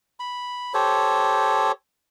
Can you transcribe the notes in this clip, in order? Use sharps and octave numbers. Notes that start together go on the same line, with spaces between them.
B5
G4 A4 C5 C#5